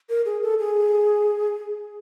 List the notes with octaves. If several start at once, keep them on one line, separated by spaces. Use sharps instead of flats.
A#4
G#4
A4
G#4